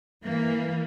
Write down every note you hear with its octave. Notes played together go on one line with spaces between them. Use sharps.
E3 A#3